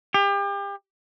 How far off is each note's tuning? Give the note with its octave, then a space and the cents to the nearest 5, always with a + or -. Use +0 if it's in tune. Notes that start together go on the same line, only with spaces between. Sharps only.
G4 +35